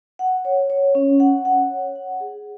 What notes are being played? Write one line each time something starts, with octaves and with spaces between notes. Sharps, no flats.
F#5
C#5
C#5
C#4
F#5
F#5
C#5
F#5
G#4